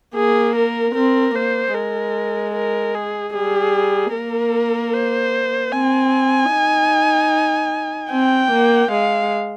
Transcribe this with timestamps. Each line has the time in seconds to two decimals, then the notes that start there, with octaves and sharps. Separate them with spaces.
0.15 A#3 G#4
0.56 A#4
0.95 C4 A#4
1.35 A#3 C5
1.75 G#3 A#4
2.55 A#4
2.95 G#4
3.34 G3 G#4
4.13 A#3 A#4
4.94 C5
5.73 C4 G#5
6.52 D#4
8.11 C4 G5
8.52 A#3
8.91 G#3 F5